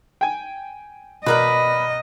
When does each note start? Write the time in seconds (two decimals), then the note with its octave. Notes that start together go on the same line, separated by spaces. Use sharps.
0.21 G5 G#5
1.26 B2 A#4 B4 D5 D#5 B5 F#6